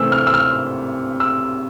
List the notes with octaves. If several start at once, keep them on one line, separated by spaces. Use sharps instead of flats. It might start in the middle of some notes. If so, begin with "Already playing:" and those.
Already playing: C3 E3 A3 C4 E6
F6
E6
F6
E6